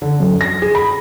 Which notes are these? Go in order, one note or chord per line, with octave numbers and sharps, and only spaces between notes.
D3
F#2
A#6
G#4
B5